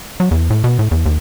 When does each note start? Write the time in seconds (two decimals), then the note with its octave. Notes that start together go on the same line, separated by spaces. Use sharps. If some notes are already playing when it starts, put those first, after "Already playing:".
0.20 F#3
0.31 E2
0.50 A2
0.64 B2
0.79 A2
0.91 E2
1.06 D#2